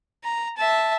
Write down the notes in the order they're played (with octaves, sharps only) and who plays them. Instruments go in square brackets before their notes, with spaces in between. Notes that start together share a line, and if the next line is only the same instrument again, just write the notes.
[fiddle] A#5
E5 A5